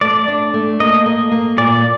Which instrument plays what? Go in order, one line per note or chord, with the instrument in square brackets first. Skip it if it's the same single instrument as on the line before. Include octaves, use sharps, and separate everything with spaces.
[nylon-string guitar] A3 [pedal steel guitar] D5
[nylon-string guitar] D4
A3
[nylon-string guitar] A#3 [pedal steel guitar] D#5
[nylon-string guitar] A#3
A#3
[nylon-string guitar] A#2 [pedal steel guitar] D5